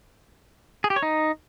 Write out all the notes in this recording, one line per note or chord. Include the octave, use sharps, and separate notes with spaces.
G#4
G4
C#5
D#4